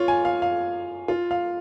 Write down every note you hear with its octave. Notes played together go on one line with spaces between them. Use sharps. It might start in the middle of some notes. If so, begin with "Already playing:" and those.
Already playing: F4 C#5
G#5
F5
F5
F4
F5